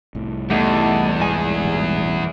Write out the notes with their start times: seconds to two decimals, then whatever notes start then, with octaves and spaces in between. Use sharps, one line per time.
0.15 C2 A2
0.50 E2 G3 A3 B3 D#4 A4
1.20 G#2 G#4 G#5
1.64 A1 B2 G3